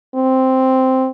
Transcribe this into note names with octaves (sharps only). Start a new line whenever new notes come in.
C4